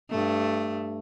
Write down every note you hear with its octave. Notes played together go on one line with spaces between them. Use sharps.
G2 A3